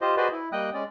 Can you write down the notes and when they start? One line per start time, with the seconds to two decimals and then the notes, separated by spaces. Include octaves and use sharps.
0.01 F4 G4 C5 D#5
0.17 F#4 G#4 B4 C5 D5 D#5
0.32 E4
0.52 G3 A#3 D#5 G5 D#6 F#6
0.74 G#3 C#4 D5